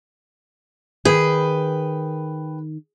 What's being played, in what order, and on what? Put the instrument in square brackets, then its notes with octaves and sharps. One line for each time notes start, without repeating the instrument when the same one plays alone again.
[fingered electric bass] D#3 [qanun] G#4 [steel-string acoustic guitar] B4 G5